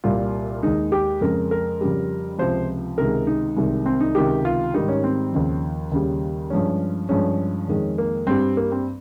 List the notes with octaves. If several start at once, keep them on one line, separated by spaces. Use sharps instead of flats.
C2 A#2 G3 F4
D#2 D#3 G#3 D#4
G4
F2 C#3 G#3 A#4
A#4
F2 C#3 G3
C#2 C3 F3 C5
C#2 C3 D#3 G#3 A#4
D#4
C2 C3 D#3 G#3
C4
D#4
C#2 C3 D#3 G#3 G4
F4
G#2 D#3 G3 D#4
C#4
C4
D#2 C#3 F3
D#2 C#3 G3
G2 F3 G#3 C#4
G2 F3 G#3 C#4
F2 D#3 G#3
A#3
G2 G3 C4
A#3
C4